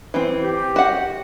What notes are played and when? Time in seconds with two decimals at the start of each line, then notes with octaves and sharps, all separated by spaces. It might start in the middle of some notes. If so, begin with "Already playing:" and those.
0.14 E3 C4
0.42 G4
0.76 F#4 F#5